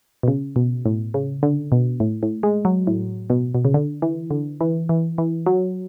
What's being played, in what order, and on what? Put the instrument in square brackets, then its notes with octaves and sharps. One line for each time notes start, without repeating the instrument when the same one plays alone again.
[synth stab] B2
C#3
B2
A2
C#3
D3
B2
A2
A2
G#3
F#3
A2
B2
B2
C#3
D3
E3
D3
E3
E3
E3
F#3